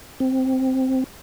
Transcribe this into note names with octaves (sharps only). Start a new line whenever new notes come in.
C4